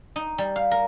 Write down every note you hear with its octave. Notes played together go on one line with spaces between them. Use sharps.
D#4
G3
F5
A#4